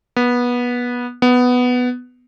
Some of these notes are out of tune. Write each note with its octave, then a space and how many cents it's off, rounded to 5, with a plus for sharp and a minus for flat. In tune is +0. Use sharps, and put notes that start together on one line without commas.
B3 -20
B3 +5